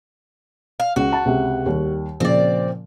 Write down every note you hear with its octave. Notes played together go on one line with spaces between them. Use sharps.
F5
C#2 F#4
A5
C#2 C3
D#2 G3
A#2 C#3 F3 C4 D5